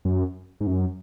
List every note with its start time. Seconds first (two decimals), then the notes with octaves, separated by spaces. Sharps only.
0.05 F#2
0.61 G#2
0.67 F#2